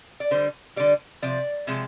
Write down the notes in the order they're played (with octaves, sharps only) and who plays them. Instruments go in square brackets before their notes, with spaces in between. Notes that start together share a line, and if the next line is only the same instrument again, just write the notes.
[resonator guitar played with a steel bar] D5
D3 G3 C5
D3 G3 D5
C3 F3 D5
C3 F3 G#3